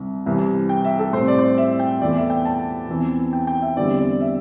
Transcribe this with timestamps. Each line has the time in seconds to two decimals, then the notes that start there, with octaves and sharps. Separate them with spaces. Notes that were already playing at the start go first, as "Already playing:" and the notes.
Already playing: C2 C3 G3
0.26 C2 C3 E3 G3
0.69 G5
0.85 E5
0.99 A4
1.13 A2 G3 C4 C5
1.28 D5
1.39 C5
1.43 D5
1.58 E5
1.79 G5
2.01 E2 E3 A3 D5
2.16 E5
2.30 G5
2.45 A5
2.89 E2 E3 C4
3.33 G5
3.47 G5
3.62 E5
3.77 E2 D3 G3 C4 D5
3.98 D5
4.21 E5